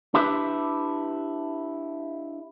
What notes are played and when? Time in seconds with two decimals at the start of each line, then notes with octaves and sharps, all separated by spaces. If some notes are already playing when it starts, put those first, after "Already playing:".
0.14 D4 E4 G4 B4 E5